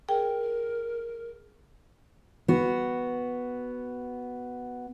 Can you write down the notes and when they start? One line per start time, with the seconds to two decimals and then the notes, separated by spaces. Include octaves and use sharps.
0.09 G#4 A#4 G5
2.48 B3 F#4